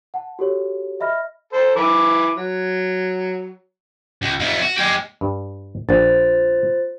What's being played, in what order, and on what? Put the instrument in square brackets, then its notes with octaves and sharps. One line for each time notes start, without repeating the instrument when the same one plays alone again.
[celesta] F#5 A5
F#4 G4 A4 C#5
D#5 E5 B5 F6 A#6
[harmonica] A4 C5
E3 B5 D6
F#3
[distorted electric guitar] C#2
F2 A3
F#4
G#3 G4
[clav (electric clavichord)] G2
[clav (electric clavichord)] A#1 [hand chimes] F4 C5 A6